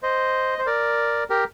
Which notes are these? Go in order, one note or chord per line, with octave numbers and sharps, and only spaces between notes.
C5 D#5
C5
A#4 D5
G4 A#4